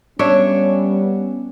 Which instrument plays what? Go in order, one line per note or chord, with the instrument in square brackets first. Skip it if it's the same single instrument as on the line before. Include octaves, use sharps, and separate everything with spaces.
[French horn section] G3 B3 C#4 [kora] D4 C#5 E5